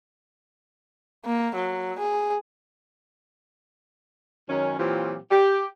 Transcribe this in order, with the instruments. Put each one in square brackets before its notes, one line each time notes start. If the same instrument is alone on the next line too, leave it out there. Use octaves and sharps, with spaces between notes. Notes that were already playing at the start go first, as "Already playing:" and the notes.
[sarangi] A#3
F#3
G#4
[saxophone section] F#2 D#3 G#3 C#4
A#2 E3 F#3 C4 F4 G4
G4